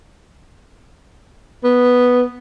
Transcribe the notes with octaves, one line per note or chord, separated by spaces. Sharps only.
B3